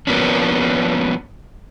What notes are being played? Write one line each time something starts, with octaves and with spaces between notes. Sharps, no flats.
F3 A#3 B3 C#4 D4